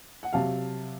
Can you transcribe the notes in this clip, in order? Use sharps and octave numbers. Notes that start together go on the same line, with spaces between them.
F#5
C3 F#3 F5 A5